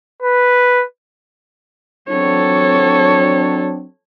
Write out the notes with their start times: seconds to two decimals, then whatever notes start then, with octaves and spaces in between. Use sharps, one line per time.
0.22 B4
2.09 F#3 C4 D4 A4 C#5